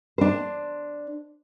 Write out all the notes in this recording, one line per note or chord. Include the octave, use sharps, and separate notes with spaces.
D4 C5